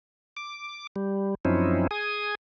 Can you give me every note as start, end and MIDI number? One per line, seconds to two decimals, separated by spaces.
0.37 0.87 86
0.96 1.35 55
1.45 1.87 42
1.45 1.87 53
1.45 1.87 60
1.45 1.87 61
1.45 1.87 63
1.45 1.87 64
1.91 2.35 68
1.91 2.35 80
1.91 2.35 87